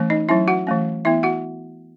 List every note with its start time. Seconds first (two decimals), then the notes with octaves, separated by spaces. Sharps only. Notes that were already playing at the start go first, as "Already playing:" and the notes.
Already playing: E3 A3 C#4
0.10 D#4 D#5
0.29 F#3 C#4 E4 E5
0.48 F#4 F#5
0.67 E3 A3 C#4
1.05 E3 B3 E4 E5
1.23 F#4 F#5